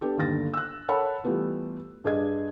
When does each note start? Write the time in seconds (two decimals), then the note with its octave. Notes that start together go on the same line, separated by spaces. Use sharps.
0.01 B3 D4 G4 A4
0.18 G1 D#2 D3 A6 A#6
0.54 E6 F#6
0.88 A4 A#4 C#5 F#5 A5 B5
1.24 E3 G3 A3 B3 F4
2.04 G2 D4 G#4 D#5 G#6